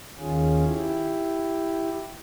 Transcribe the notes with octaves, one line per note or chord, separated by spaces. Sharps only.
D#2 D#3 C#4 F4 G#4
E4 G4